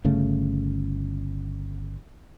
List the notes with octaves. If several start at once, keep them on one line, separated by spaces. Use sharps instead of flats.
G1 C#3 A3